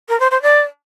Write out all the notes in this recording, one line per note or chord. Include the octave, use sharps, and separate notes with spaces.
A#4
C5
C5
D5